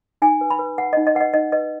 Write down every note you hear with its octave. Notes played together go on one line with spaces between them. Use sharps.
D#4 G#5
B4
B5
B4
B4 F#5
D#4 D#5
D#5
B4 F#5
D#5
D#4 D#5
B4 D#5